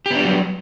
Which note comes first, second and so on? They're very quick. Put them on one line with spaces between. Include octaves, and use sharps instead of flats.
G4 B3 D4 G3 F#3